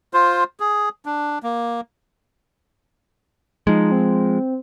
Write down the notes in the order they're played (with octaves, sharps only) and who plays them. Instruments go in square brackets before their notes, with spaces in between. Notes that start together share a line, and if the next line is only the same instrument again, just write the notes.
[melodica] F4 C5
G#4
D4
A#3
[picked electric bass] F3 G#3 [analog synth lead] D#4
[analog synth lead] C4